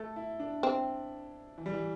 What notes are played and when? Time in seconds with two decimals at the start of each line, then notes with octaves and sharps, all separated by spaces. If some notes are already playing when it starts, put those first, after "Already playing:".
Already playing: A3 A4
0.16 E4
0.39 D4
0.63 C4
1.58 E3
1.66 G3
1.74 E3